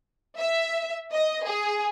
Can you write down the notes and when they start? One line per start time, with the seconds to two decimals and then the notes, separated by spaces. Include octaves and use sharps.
0.39 E5
1.13 D#5
1.45 G#4